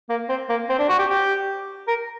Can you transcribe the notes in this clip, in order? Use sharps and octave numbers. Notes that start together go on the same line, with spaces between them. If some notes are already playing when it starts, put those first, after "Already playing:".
A#3
C4
A#3
C4
D4
F#4
G4
G4
A#4